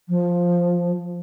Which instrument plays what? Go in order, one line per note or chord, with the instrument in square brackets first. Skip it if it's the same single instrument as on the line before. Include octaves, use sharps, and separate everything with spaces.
[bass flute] F3